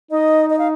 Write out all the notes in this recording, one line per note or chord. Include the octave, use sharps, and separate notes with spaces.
D#4 D#5
D#5
F5